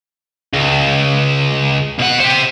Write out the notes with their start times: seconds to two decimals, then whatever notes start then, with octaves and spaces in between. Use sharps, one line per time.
0.53 C#2
1.99 B2 F#5
2.20 G4 C5